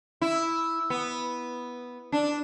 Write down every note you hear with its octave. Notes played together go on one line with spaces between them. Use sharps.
E4
B3
D4